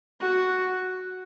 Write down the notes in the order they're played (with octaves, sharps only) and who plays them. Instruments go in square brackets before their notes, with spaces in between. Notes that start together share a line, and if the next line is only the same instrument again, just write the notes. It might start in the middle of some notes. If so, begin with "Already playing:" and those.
[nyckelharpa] F#4